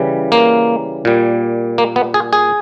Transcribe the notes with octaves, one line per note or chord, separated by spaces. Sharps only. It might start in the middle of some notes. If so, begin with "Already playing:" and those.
Already playing: C#3 E3 G3
A#3
A#2 G3
A#3
B3
G#4
G#4